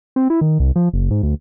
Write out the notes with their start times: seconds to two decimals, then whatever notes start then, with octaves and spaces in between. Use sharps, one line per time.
0.16 C4
0.30 E4
0.41 D#3
0.60 C2
0.76 F3
0.93 F#1
1.11 G#2
1.23 D2